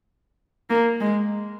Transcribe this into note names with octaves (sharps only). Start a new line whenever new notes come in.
A#3
G#3